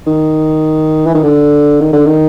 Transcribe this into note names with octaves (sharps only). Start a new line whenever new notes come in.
D#3
E3
D#3
D3
D#3
D3
D#3